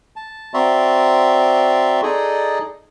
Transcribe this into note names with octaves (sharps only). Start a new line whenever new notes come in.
A5
C4 F#4 D5 E5 A#5 C6
D#4 G#4 A4 D5 D#5